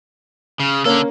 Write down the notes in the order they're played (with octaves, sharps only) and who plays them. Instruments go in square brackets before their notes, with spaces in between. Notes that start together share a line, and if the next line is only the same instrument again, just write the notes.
[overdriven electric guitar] C#3
[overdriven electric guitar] D3 A4 [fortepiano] A#3 C#4